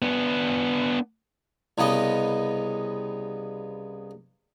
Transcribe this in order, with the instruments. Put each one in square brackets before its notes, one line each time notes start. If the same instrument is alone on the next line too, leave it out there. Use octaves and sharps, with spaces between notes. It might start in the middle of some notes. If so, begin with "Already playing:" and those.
[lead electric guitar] B3 D4
[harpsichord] C2 C#3 B3 D#5